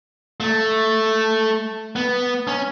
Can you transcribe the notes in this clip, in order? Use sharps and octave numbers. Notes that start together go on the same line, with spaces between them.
A3
B3
C#4